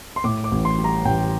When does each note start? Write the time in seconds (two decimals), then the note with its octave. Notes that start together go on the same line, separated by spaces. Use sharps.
0.16 C6
0.24 A2 D6
0.44 D6
0.51 A1
0.65 C6
0.78 G3
0.84 A#5
1.05 A1 G5